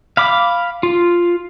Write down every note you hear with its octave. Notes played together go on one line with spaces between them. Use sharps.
F5 B5 D6
F4